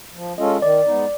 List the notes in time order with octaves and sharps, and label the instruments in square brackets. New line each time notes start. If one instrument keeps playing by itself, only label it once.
[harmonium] F3
[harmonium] G#3 C#4 F4 A4 [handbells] D#5
[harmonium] D#3 [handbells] D5
[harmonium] G#3 B3 D#4